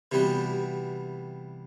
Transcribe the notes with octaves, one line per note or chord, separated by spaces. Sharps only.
C3 E3 G3 B3 F#4